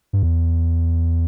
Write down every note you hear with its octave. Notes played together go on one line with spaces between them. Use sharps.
G2
E2